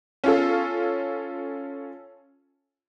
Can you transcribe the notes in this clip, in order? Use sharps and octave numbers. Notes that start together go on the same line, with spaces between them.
C#4 F4 A4